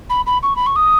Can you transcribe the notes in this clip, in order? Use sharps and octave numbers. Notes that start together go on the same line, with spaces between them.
B5
B5
C#6
B5
C#6
D#6